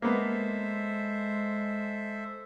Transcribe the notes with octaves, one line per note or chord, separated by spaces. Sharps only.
G#3 A#3 B3 A4 C5 E5